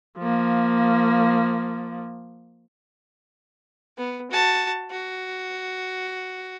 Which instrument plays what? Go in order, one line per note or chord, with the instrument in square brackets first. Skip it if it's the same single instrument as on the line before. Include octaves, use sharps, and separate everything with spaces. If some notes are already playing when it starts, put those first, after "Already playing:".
[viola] F3 A#3
[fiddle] B3
F#4 A5
F#4